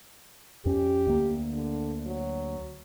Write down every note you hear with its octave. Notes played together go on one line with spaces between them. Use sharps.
F2 C#4 G4
D2 A#3
D3
F#3